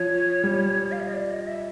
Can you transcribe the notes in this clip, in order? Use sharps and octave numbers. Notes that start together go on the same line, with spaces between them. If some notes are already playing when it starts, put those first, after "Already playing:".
Already playing: F3 C#5
G3
F5
E5
D#5
D5
D#5
E5